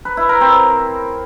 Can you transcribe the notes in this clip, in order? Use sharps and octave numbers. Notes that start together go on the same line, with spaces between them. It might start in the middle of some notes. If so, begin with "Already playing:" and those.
B4
E4
A#4
C4